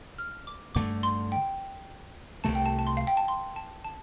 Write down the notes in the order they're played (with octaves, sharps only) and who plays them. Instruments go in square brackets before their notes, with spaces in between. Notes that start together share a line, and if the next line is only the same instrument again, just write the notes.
[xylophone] F6
D6
[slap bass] G2 D3 A3 [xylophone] D6
[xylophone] C6
G5
[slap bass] C2 C3 A3 [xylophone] A5
[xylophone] G5
A5
A5
C6
F5
G5
A5
C6
A5
A5